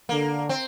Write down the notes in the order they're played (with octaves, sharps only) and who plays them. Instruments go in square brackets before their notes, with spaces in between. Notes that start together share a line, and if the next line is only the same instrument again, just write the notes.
[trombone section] D3 [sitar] A#3
[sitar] C4